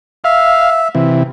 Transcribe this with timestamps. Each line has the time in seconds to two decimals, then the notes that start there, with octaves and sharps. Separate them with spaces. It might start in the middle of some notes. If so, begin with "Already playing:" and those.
0.24 E5 F5
0.95 C3 E3